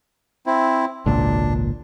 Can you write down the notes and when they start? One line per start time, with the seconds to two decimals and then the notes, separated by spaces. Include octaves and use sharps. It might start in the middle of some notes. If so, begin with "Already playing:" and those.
0.46 C4 E4
1.06 G#1 C#2 A#2 D4